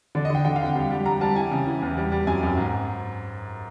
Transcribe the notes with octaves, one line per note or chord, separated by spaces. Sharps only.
D3 D5
D#5
D3 G5
D3 G5
F5
F2 F#5
G3
G3
G3 A#5
G3 A5
E3 G#5
C#3
E3
E2
G3
G3
F#2 G#5
F#2
G#2